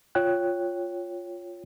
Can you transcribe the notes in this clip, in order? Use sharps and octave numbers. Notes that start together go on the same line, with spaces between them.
F4 C#5 G5 F#6